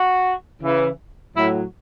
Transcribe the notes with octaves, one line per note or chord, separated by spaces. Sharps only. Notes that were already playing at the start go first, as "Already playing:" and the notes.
Already playing: F#4
C#3 E3
A2 F#3 E4